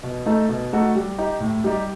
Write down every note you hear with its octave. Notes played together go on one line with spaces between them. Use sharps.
B2
A3 D#4 A4
B2
A3 D#4 F#4 A4
G3
D#4 G4
A2
G3 D#4 G4